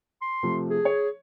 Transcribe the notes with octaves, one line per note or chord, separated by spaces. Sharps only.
C6
C3 F3 A3
G#4
C#5